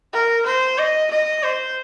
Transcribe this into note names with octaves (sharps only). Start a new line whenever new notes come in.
A#4
C5
D#5
D#5
C5